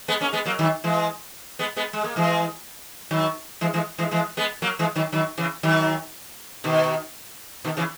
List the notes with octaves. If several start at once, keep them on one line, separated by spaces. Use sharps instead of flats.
G#3 B3
A#3 C#4
G#3 B3
F#3 A#3
D#3 F#3
E3 G#3
G#3 B3
G#3 B3
G#3
A#3
E3 G#3
D#3 F#3
E3 G#3
E3 G#3
E3 G#3
E3 G#3
G#3 B3
F#3 A#3
E3 G#3
D#3 F#3
D#3 F#3
C#3 E3
D#3 F#3
B2 D#3
B2 D#3
C#3 E3